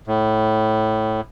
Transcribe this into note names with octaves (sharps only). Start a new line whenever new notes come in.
A2